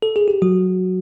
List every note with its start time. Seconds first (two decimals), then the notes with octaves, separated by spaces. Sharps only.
0.02 A4
0.16 G#4
0.28 G4
0.42 F#3 F#4